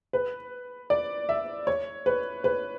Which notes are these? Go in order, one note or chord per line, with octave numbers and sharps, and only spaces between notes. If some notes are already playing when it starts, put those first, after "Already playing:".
B4
D5
E5
C#5
B4
B4